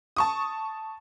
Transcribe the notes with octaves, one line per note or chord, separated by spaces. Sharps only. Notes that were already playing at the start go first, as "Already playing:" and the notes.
A5 C#6 D#6